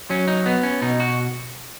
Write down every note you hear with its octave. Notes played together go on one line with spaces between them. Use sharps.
F#3 C#4
D#4
B3
C#4
B2 D#4
F#4